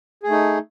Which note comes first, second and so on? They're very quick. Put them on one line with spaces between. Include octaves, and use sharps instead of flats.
G#4 A3 D#4